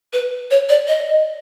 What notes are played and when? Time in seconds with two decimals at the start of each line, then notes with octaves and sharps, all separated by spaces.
0.13 B4
0.51 C#5
0.69 D5
0.88 D#5